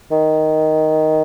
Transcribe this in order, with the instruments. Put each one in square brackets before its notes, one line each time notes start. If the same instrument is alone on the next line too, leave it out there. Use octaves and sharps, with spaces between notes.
[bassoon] D#3